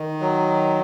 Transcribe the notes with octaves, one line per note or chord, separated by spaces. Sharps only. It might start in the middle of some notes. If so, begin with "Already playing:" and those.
Already playing: D#3
F#3